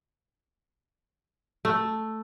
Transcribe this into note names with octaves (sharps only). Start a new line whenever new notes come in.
A3